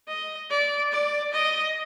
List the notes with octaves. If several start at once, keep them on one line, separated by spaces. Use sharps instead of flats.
D#5
D5
D5
D#5